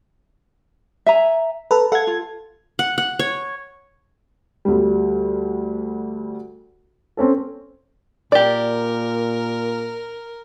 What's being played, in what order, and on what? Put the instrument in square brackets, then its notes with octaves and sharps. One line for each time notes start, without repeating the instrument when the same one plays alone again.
[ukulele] E5 G#5 A#5
[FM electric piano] A4 B4 [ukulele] A#5
[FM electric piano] A4 G#6 [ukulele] F5 F#5
[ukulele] F4
[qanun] F#5
F#5
C#5
[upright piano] D2 G3
C4 C#4 A4
[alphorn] A#2 [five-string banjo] G4 D5 [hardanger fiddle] A#4